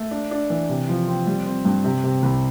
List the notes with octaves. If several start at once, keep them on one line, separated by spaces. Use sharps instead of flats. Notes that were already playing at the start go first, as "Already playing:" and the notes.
Already playing: A3
D4
D4
E3
C3
F3
C4
G3
C4
G2
C3
C3
C2